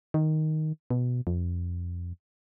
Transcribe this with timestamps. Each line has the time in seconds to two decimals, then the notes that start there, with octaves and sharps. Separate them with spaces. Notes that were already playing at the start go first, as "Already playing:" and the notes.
0.14 D#3
0.91 B2
1.27 F2